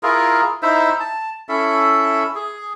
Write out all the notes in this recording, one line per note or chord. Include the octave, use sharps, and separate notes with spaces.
E4 F4 G#4 A#4
D#4 E4 C5 E5
A5
C#4 E4 A4 E5
G#4